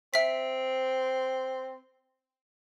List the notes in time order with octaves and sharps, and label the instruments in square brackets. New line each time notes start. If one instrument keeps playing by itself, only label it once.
[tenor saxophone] C4 [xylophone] E5 B6